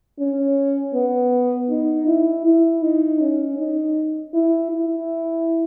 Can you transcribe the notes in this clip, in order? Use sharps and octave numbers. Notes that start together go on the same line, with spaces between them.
C#4
B3
D#4
E4
E4
D#4
C#4
D#4
E4
E4